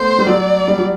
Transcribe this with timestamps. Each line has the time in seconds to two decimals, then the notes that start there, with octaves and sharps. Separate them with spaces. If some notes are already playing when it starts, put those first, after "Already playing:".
Already playing: A3 B3 C5
0.18 G3
0.26 F#3 D5
0.68 G3
0.78 F#3